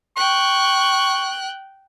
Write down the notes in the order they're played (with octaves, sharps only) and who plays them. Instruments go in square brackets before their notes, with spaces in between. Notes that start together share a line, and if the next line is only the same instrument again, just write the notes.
[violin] G5 F#6 [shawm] C#6